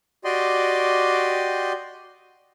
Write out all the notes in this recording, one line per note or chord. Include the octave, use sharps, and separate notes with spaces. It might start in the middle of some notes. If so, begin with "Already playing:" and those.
F#4 G4 D5 D#5 G5 C6